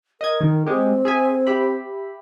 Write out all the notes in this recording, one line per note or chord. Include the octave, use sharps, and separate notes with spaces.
A#4 D#5 G#6
D#3
G#3 C4 G4
G#4 E5 G#5
G4 E5 B5